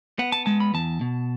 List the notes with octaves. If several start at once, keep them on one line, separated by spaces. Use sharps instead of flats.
B3 F#5
A5
G#3 A5
B5
E2 A5
B2